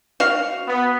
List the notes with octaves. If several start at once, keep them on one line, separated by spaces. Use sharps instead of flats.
F#4 F5
B3